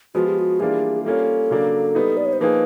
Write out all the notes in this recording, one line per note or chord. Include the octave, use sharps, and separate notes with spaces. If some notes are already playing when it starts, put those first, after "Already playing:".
F3 G#3 B3 F#4
G4
F#4
E3 G3 A#3 D4 F4 G#4
G3 A#3 C#4 F4 A4
C#3 F#3 A#3 D4
G3 B3 D#4
D5
C#5
C5
F3 A#3 D#4 G#4 B4